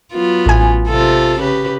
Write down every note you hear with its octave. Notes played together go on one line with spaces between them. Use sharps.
F#3 B3 F4
A1 G#5
C3 F4 A4
C#3 G4 B4